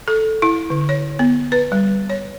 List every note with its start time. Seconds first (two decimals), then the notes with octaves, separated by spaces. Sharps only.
0.08 A4
0.42 E4
0.70 D3
0.89 C#5
1.19 B3
1.52 B4
1.72 G3
2.10 C#5